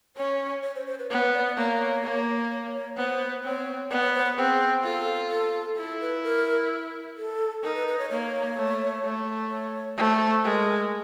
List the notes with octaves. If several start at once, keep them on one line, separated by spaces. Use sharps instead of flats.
C#4 C#5
C#5
C5
C5
B4
B3 C#5
D5
D5
A#3 C#5
A#3
C#5
C#5
B3 C5
C4 C#5
B3 D5
C#5
C5
B4
C4 G#4
F4 A4
A4
E4 A4
B4
A#4
A4
D#4 A#4
B4
B4
C#5
A#3 C#5
A3
A3
C#5
A3 C5
G#3 A#4